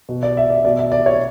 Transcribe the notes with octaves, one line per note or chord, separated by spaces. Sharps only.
B2
D5
E5
D5
B2 D5
E5
D5
C#5